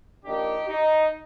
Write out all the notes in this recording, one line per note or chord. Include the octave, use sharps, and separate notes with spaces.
F3 A#3 D4 D#4 G4
D#4